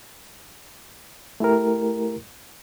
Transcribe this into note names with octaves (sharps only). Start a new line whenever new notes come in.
A3 E4 G4 A#4